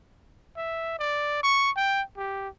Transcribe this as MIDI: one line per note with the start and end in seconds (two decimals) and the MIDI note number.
0.56 0.94 76
0.99 1.40 74
1.43 1.71 85
1.76 2.02 79
2.17 2.48 67